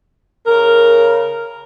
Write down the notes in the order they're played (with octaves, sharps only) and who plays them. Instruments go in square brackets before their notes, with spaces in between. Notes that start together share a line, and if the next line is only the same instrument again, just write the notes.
[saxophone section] C#3 A#4